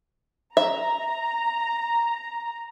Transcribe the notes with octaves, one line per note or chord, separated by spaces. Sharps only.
E5 A#5